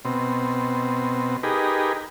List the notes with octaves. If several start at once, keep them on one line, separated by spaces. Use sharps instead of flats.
B2 C4
D#4 G4 G#4 A#4 B4